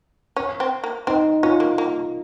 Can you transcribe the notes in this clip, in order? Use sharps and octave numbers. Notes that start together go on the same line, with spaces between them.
C#4
C4
A#3
C4 D#4
C#4 F4
A#3
A#3